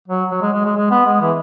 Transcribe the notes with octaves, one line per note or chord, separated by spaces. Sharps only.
F#3
F#3
G#3
G#3
G#3
G#3
B3
G#3
E3